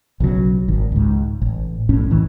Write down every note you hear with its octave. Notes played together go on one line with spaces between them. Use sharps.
B1 C#3 E3 F#3
G#1 D#3
C#2 G#2
A1
B1 F2 A2 C#4
A2 D#3 E3